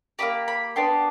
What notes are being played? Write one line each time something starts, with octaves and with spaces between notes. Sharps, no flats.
A#3 D#4 G4 B5
B5
B3 D4 G4 C6